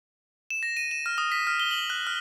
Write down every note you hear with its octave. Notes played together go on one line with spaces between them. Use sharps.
E7
A#6
D#7
E7
F6
D#6
B6
F6
G7
F#7
F#6
F6